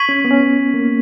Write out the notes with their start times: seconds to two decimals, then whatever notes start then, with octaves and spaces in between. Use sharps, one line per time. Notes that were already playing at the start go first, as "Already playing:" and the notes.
Already playing: C#6 G#6 B6 D#7 F#7
0.09 C#4
0.25 B3
0.31 C#4
0.74 A#3